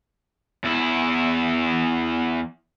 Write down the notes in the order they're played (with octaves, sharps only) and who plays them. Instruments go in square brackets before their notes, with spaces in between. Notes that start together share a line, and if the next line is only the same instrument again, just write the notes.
[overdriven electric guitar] E2 E4